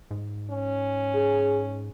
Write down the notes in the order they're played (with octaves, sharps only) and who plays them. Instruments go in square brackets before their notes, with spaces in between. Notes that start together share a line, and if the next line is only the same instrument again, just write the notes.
[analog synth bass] G#2
[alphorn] C#4
[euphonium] G#4